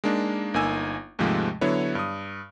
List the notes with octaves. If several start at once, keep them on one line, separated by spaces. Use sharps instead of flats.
G#3 A#3 D4 D#4
G1 A#3 D#4 G#5 E6
D#2 G#2 C3 F3 G#3 A3
D3 F#3 B3 E4 C#5
G2 D#6